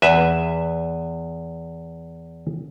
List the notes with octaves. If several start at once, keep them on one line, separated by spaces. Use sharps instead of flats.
E2 B4 E5